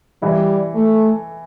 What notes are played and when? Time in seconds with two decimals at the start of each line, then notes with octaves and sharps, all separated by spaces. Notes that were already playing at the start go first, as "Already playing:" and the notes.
0.22 E3 G3 E4
0.74 A3